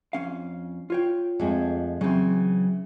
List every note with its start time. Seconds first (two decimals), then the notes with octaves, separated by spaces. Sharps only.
0.13 F2 C#4 F5
0.90 F4 C#5 G5
1.40 F2 G#3 A3
2.01 C#3 E3 F#3 C4